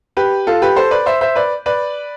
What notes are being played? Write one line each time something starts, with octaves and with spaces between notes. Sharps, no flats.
G4 B4
F4 A4
G4 B4
A4 C5
B4 D5
C5 E5
C5 E5
B4 D5
B4 D5